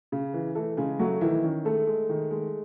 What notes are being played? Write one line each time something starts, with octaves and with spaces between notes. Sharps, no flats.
C#3
E3
E3 A3 A4
C#3 G#3 G#4
F#3 A3 F#4
D#3 E3 E4
D#3 C#4
G#3 A3 A4
G#3
D#3
G#3